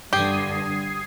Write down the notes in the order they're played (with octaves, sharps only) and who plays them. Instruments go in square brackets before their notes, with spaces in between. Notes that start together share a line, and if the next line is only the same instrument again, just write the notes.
[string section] G2 D3 [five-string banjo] G4 [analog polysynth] D#6 G#6 C7